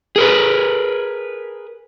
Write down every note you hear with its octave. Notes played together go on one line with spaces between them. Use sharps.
G#4 A#4 B4